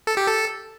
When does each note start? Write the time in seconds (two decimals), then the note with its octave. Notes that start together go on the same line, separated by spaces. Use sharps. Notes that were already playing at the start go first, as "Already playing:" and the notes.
0.07 A4
0.17 G4
0.27 A4